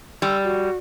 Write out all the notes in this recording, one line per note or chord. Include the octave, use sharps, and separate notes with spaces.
G3 E6
F#4